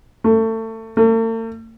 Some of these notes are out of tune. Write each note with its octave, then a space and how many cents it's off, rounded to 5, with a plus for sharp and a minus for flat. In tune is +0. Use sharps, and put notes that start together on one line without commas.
A3 +25
A3 +45